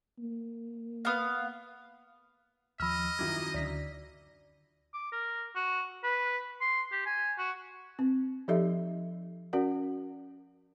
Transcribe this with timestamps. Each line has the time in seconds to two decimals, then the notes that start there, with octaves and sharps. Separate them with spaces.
0.19 A#3
1.05 B3 F5
2.80 D#2 F3 D#5 B5 E6 F6
3.19 F#2 D#3 E4 F4 D6 G#6
3.54 D2 D3 D5 B6
4.94 D6
5.12 A#4
5.55 F#4
6.04 B4
6.61 C6
6.92 G4
7.06 G#5
7.38 F#4
7.99 C4
8.48 F3 D#4 G4 A4 D#5 E5
9.53 C#4 F#4 A#4 D5 F#5